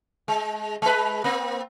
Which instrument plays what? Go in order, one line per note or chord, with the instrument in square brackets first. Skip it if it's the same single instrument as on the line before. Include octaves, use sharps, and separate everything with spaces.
[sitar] G#3
G#3 B4
A#3 C4